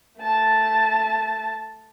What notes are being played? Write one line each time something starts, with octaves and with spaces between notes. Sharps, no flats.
A3 A5